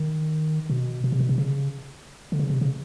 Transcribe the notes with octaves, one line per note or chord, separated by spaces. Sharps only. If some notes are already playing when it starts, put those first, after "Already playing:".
Already playing: D#3
B2
B2
C3
B2
C3
C#3
D3
C#3
C3
C#3